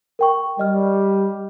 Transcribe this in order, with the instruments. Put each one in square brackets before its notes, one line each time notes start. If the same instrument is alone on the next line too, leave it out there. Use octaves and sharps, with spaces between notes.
[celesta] A#4 G5 C#6
[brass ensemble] G3 [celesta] D#5 F6